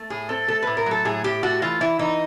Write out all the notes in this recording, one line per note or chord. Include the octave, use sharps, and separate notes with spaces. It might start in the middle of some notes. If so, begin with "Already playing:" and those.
Already playing: A3
A2 G#4
C4 A4
A3 A4
A2 B4
A#4
F#3 A4
A2 G#4
A2 G4
A3 F#4
E3 F4
E3 E4
E3 D#4